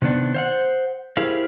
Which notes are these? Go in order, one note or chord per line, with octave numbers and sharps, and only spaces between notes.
C3 D#3 B3 D4
C5 F5 F#5
E4 G4 G#4 A#4 C5 F5